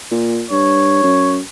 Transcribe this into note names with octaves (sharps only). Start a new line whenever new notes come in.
A#2
G2 C#5
F#2